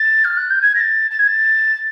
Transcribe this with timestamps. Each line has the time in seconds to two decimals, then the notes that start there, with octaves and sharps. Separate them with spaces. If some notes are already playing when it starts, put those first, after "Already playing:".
Already playing: A6
0.24 F6
0.37 F#6
0.50 G6
0.62 G#6
0.75 A#6
0.80 A6
1.11 A6
1.19 G#6
1.27 A6